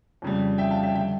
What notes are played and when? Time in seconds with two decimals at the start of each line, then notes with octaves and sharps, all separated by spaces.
0.22 F2 C#3 G3
0.58 E5 G5
0.71 F5 A5
0.83 E5 G5
0.95 D3 G3 E5 G5